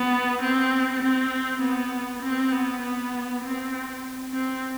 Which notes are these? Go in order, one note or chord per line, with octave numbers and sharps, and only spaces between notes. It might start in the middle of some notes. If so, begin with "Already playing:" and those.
Already playing: B3
C4
C4
B3
C4
B3
B3
C4
C4